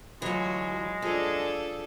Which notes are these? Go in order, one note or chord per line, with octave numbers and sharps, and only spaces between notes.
D2 E3 F#3 G#3 F4 F#4
F3 D4 G#4 A4